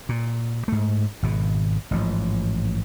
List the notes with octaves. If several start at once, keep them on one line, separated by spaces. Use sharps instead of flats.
A#2
G#2 A3
G#1 B2
A1 G#2 F3